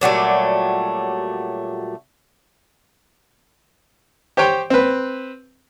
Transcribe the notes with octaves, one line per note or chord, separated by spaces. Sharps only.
A#2 F#3 G3 A3
G4 C5 C#5 G5
C4 B4